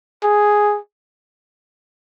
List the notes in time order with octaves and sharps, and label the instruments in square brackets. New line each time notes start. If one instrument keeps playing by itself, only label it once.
[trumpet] G#4